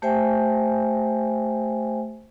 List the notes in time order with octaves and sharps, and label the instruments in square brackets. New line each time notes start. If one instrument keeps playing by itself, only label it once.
[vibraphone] A3 G4 C5 E5 G5 G#5